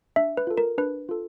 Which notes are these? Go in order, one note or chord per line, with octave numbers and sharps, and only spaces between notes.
D4 E5
B4
F4 A4
A#4
D4 B4
F4 A4